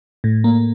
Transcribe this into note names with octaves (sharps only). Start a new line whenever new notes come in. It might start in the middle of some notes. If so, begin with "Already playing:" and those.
A2
A#3